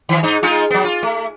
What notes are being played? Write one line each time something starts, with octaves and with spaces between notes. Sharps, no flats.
D#3 E3
G#2 D#4
G#3 D#4 F4
F#3 B3
F4
A3